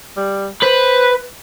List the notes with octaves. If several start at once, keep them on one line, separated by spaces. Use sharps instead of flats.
G3
B4 C5